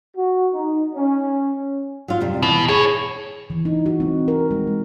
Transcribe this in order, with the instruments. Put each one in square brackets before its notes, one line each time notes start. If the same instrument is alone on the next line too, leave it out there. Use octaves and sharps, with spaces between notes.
[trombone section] F#4
D#4
C#4
[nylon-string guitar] F#3 F4
F2 C3 G3
[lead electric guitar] B2 [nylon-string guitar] E3
[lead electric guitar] E4 C#5 [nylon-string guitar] G#4
[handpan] E3
D#4
F#4
C4
A#4
G#3
G#3